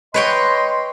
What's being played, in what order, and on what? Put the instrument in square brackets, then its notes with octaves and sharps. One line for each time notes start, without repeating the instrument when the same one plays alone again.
[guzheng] B4 C#5 G5 [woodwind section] D#5 C6